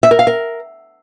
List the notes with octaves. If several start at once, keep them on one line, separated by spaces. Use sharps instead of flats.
E5
A#4
F5
A#4